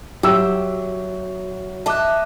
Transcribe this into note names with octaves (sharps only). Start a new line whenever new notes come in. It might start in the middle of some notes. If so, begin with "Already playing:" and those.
F#3 G4 E5 E6
D#5 E5 A5 D6 F#6